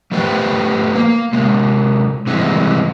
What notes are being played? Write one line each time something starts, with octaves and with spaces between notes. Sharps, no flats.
F3 A3 G4 B4 C5 G5
A#3
C3 G#3
C3 E3 G3 G#3 C4